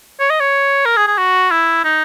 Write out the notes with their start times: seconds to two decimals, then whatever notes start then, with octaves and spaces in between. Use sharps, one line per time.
0.20 C#5
0.30 D#5
0.40 C#5
0.85 A#4
0.97 G#4
1.07 G#4
1.18 F#4
1.51 E4
1.84 D#4